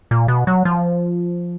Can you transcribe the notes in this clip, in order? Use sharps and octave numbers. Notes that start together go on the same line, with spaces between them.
A#2
B2
F#3
F3